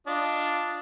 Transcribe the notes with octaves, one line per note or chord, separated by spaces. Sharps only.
D4 F4 D#5